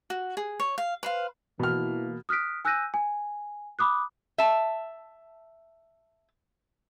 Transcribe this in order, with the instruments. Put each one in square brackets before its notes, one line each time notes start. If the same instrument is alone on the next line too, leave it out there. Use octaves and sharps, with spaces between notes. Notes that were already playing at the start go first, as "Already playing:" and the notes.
[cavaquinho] F#4
G#4
C#5
F5
B4 C5 F5
[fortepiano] B2 F6 [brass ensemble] E3 A#3
[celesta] D#6 F6 F#6 B6 D7
G#5 E6 F#6 G6 A#6 D#7
G#5
B5 D6 D#6 F#6
[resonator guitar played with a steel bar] E5 A5